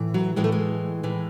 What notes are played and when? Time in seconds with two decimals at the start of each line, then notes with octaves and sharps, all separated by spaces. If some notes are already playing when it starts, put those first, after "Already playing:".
Already playing: A2 E3
0.14 F#3
0.36 A2 E3 G#3
0.44 A3
0.52 G#3
1.03 A2 E3